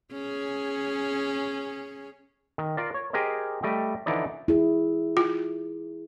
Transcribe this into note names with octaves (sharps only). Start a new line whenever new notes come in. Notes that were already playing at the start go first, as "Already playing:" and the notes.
C#4 G#4
D#3
F4 A#4 D5
C#5
G4 G#4 A#4 C5 D#5
G3 A3 D#5 G5
D3 E3 F3 D#4 E4 D5
E4 G#4
F4